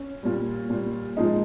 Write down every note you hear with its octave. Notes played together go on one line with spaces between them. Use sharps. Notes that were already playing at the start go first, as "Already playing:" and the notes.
Already playing: C#4
A#2 G3
A#2 G3
A#2 F3 G#3 D#4